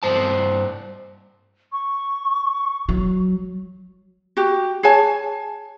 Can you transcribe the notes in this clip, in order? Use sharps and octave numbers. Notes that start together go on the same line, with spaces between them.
G2 C5 A5
C#6
F#3
F#4 G4
G#4 C#5 G#5 A5